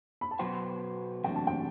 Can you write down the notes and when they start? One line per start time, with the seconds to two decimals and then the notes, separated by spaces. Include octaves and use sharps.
0.21 B5
0.31 A5
0.39 B2 F#3 B3 F#4 C5 G5
1.24 E2 C3 F#3 A3 D4 G5
1.35 A5
1.47 G5